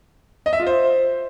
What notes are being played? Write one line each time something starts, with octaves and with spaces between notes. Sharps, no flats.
D#5
E5
F4
C5